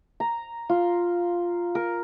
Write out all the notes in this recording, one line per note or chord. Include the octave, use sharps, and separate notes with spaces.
A#5
F4
A#4